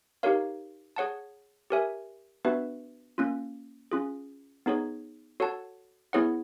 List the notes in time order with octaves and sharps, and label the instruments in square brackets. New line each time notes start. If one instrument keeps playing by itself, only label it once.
[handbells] D#4 G4 A#4 C#5 F5
G#4 C#5 F#5 A5
G4 A#4 C#5 E5 G#5
B3 D4 F#4 B4 E5
A#3 C#4 F4
C#4 F4 G#4
B3 D#4 G#4 C#5
F#4 A4 C#5 F#5 A5
B3 E4 G#4 C#5 F#5